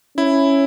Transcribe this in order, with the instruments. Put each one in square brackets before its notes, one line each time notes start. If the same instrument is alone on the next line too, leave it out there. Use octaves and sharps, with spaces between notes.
[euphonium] C#4 [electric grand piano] E4